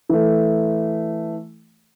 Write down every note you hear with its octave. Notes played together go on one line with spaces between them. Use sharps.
E3 A3